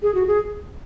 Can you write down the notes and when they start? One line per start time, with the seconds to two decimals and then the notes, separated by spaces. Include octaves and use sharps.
0.02 G#4
0.14 F#4
0.27 G#4